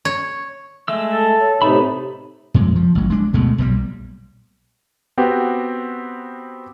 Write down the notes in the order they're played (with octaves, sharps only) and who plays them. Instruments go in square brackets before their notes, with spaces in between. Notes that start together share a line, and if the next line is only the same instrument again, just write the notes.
[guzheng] C#5
[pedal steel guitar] G#3 A3 E6 [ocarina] E5
[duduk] A4
[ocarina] C#5
[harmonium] A2 C3 [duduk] D#4 [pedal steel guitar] B4 E5 B5
[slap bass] F2 A#2 G#3
F3
A1 F#3
G#3 D4
D2 B2 G#3 A3
B1 A#2 D3 G3
[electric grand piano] B3 C4 F#4 G4